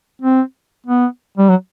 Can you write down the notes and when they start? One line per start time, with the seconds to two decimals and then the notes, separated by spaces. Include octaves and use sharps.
0.22 C4
0.87 B3
1.38 G3
1.50 F#3